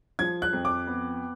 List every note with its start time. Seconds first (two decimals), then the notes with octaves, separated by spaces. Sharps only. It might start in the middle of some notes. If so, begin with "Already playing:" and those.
0.19 F3 G#6
0.42 F#6
0.53 F2
0.65 D6
0.87 B3